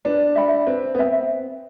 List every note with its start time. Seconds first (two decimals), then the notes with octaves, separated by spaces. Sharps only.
0.05 D4 B4
0.35 E5 G5 B5
0.67 C4 B4
0.95 B3
0.98 C4 E5 G5